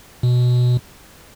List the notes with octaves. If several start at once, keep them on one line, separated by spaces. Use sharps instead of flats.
B2